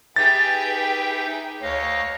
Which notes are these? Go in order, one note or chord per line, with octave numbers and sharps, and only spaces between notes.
D#4 G4 G#4 B4 E5 G5 A6
D2 C#5 D#5 F5